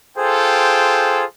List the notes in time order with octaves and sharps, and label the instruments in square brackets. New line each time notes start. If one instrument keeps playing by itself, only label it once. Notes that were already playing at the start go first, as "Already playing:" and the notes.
[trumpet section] F4 A4 G5 [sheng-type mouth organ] G#4 C5